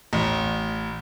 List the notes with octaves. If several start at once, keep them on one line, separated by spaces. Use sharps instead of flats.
A1